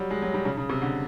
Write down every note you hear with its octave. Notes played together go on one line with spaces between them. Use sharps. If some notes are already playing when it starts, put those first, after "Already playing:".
Already playing: F#3 G3
G#3
F#3
G3
C#3
C#3
C3
D3